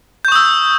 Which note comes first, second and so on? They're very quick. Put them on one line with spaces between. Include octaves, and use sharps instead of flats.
G6 C#6 D#6 E6